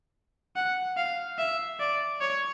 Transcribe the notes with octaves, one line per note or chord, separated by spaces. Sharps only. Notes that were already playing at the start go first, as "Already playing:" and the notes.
F#5
F5
E5
D5
C#5